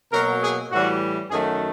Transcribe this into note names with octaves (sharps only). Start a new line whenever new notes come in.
B2 F#3 A#3 A#4
G#4
A2 E3 G3 F#4
F#2 D#3 F#3 A3 G#4